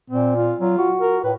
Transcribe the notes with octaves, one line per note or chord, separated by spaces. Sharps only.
A#2 C4
F4
F#3 F4
F#4
A#4
A2 B4